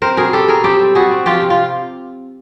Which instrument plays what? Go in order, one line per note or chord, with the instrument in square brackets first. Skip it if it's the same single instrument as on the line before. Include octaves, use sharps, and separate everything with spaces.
[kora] C4 A#4 C5
B2 G#4 A#4
B2 G4 A4
B2 G#4 A#4
C4 G4 A4
G3
G3 F#4 G#4
C4
F3 F4 G4
C3
F4